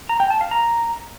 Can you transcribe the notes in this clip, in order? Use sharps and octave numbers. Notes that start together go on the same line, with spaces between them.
A#5
G5
A5
F5
A#5